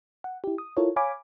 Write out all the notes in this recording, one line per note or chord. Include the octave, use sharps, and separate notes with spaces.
F#5
E4 G4
D#6
E4 F4 A4 A#4 C#5
C#5 F5 G#5 B5 D6